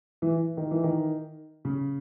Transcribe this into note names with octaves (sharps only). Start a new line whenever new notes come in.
E3
D#3
E3
D#3
C#3